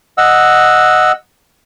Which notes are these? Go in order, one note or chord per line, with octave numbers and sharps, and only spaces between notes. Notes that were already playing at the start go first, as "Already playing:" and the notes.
D#5 F#5 E6